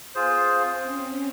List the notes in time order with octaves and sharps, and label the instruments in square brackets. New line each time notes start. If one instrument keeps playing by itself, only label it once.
[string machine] B3 [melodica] F4 G#4 C5
[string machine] C4
C#4